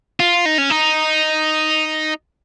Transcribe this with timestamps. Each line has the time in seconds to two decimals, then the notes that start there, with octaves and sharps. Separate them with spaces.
0.20 F4
0.46 D#4
0.58 C#4
0.70 D#4